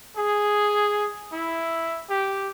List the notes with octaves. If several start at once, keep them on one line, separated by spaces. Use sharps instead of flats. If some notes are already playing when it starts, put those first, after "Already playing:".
G#4
E4
G4